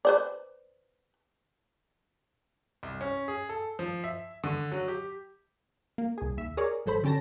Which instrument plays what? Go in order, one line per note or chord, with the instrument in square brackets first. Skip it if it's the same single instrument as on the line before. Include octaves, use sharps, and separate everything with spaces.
[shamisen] B4 C5 D5
[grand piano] C2
C#4
G#4
A4
F3
E5
D3
F#3
G4
[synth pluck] A#3
C2 G#4
D#2 E5
G#4 A#4 C#5 D5
G#1 F#3 A4 C5 B5
D3 C#4 G4 A5 A#6